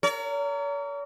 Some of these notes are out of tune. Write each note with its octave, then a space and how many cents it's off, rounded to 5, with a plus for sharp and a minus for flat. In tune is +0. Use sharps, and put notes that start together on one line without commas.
A#4 -20 C#5 +45